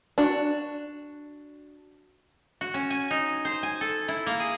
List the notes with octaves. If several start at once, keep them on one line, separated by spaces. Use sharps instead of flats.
D4 F#4
F#4
C#4
G#5
D#4
C5
G#5
A4
E4
A#3
G#4